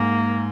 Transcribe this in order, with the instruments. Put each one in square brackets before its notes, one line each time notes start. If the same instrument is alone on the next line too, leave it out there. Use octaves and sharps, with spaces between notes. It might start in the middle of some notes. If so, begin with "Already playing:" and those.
Already playing: [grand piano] G#2 [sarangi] A#3